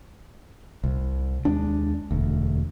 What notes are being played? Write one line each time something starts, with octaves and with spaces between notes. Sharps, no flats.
C2
D#2 G#3 D4
E1 D2